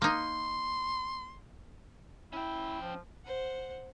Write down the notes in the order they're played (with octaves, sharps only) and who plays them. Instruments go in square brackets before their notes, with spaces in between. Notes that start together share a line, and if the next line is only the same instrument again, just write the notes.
[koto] A#3 D#4 [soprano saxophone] C6
[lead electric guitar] C#4 G5 [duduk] E4
[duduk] F3
[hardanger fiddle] C5 F#5